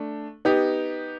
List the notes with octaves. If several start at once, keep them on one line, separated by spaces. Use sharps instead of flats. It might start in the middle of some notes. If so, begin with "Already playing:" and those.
Already playing: A3 D4
B3 D#4 G4